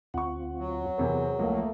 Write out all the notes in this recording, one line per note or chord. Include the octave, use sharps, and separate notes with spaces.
D2 C4 F4 F#5 C#6
F#3
E2 C3 E3 G#4 A#4 C5
C#2 F3 A3 A#3